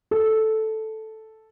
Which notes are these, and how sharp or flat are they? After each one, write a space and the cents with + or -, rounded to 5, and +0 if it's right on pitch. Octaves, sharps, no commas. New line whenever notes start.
A4 -5